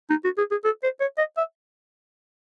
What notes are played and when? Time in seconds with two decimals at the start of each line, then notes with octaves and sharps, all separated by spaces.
0.10 D#4
0.24 F#4
0.38 G#4
0.51 G#4
0.64 A4
0.83 C5
1.00 C#5
1.18 D#5
1.37 E5